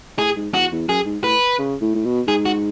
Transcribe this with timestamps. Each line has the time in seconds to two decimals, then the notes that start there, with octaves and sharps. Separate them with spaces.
0.19 A2 G#4
0.36 G#2
0.54 E2 F#4
0.72 E2
0.88 F#2 G#4
1.05 G#2
1.23 A2 B4
1.59 C#3
1.81 A2
1.95 A2
2.05 B2
2.27 G#2 G#4
2.45 F#4